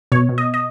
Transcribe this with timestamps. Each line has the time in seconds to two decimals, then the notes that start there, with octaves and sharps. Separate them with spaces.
0.12 B2 C#5
0.29 B2
0.38 D#5
0.54 D#5